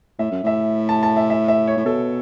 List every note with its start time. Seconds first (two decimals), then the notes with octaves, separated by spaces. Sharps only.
0.19 A2 E5
0.31 F#2
0.43 A2 E5
0.89 A5
1.03 A5
1.17 E5
1.30 E5
1.48 E5
1.68 C#5
1.77 A2
1.85 B2 A4